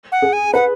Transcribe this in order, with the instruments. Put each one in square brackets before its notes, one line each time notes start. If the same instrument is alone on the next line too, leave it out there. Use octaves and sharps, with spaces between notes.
[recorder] F#5
[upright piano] G#4
[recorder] G#5
[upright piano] B4 [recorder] F#5